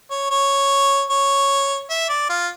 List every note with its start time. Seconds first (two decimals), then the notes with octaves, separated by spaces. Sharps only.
0.11 C#5
0.31 C#5
1.10 C#5
1.90 E5
2.09 D5
2.30 F4